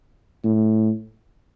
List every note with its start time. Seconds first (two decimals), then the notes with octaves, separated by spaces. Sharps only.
0.44 A2